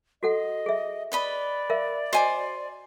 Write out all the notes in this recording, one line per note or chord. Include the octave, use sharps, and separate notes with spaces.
F#4 A4 D#5 F#5
G#4 E5
B4 D5 D#5 B5
A#4 E5 F5
F#4 C5 D#5 G#5 D6